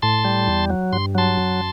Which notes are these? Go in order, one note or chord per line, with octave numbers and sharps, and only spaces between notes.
A2 A5 C6
G3
E2
F#3
G2 C6
F#3 A5 C6
F#2